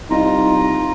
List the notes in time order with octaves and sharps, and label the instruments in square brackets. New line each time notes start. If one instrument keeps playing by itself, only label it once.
[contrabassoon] C2 [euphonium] D#4 [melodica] F4 A#5